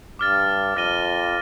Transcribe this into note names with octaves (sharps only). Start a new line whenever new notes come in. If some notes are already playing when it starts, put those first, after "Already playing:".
G2 D6 F6 A6
F2 F6 A#6 D#7 G7